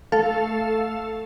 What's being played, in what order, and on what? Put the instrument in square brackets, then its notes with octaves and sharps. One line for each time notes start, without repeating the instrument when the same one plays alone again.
[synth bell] A3 A4 F5